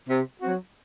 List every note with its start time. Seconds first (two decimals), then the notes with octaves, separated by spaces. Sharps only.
0.09 C3
0.42 F#3 C4 F#4